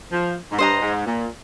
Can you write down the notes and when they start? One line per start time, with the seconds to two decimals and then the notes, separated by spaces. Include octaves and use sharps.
0.12 F3
0.52 G#2
0.58 G2 C5 D#5 A#5
0.82 G#2
1.06 A#2